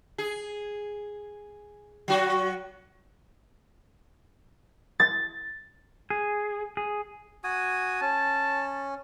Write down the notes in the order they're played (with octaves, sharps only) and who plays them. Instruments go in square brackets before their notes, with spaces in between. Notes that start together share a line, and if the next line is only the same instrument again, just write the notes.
[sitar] G#4
F#3 F#4
[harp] A6
[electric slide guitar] G#4
G#4
[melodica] F#4 G#5 D#6
[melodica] C#4 [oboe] A5